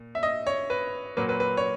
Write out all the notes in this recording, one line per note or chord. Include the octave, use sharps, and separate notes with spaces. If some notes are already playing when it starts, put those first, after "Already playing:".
Already playing: A#2
E5
D#5
C#5
B4
A#2 F#3 A#3 B4
B4
B4
C#5